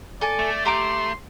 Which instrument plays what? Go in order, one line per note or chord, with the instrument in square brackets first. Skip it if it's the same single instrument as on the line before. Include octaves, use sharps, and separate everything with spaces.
[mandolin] A4 G#5 A5 [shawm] D5
[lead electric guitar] A3
[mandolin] G4 A#5 D6 [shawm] C6